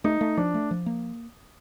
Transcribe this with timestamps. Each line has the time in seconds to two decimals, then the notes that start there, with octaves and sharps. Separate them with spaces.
0.04 A3 D#4
0.21 A3
0.37 F3 D4
0.54 A3
0.71 F3
0.86 A#3